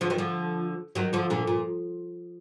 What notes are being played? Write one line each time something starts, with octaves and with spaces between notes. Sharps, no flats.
D3 F3
D#3 F#3
D3 F3
D#3 F#3
D3 F3
A#2 D3
A#2